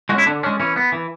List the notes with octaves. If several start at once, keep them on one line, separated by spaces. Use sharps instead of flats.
G#3 C#4 E4 F#4
D3 D4
G#3 C#4 D4
E3 C#4
B3
E3